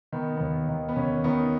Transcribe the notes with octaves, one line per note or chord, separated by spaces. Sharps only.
D#3 B3
D#2 B3
D#3
B3
D#2 C#4
D#3 B3 D#4